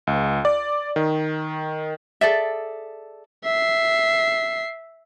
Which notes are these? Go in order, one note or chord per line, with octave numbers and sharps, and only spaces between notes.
C#2
D5
D#3
G#4 A4 D5 E5
E5 C7